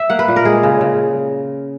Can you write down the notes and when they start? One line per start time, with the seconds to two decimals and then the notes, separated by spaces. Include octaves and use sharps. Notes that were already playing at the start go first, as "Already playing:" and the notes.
Already playing: E5
0.10 A#3 F#5
0.19 B4
0.28 A#2
0.36 A#4
0.45 G#3 G#4
0.63 C#3
0.81 C#3